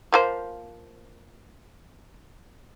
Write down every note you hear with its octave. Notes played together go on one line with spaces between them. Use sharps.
F3 A#3 C5